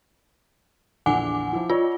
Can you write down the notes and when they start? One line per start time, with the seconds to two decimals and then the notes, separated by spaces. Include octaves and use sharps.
1.06 A#1 E2 D3 F#5 G#5 D6
1.53 F3 E4
1.70 F4 C#5 D5